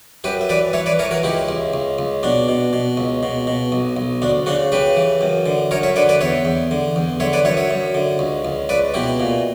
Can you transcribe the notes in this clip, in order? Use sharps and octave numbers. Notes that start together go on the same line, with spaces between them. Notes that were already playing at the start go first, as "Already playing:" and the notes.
F#2 G4 B4
E5
E3 B4 D5
E3 C#5 E5
B4 D5
E3 A#4 C#5
F#4 A#4
C#2 E4 G4
C#2
C#2
C#2
B2 D4
B2
B2
C#2
B2
B2
B1
B1
D2 D4
C#3 D4 F#4
C#3 G4 B4
E3
F#2
D3
F#2 A#4 C#5
C#5 E5
D3 B4 D5
B4 D5
E2 C#5 E5
E2
D3
E2
D3 C#5 E5
B4 D5
F#2 C#5 E5
C#5 E5
F#2
D3
C#2
C#2
C#2 B4 D5
B2 E4 G4
A#2